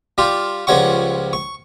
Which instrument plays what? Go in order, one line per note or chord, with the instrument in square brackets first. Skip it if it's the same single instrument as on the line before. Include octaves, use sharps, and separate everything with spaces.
[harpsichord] G3 F4 G4
C#2 F3 G3 C#5 F#5 C#6
C#6